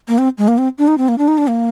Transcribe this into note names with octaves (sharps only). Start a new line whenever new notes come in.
A#3
C4
G#3
A#3
C4
D4
D#4
C4
A#3
D4
D#4
D4
A#3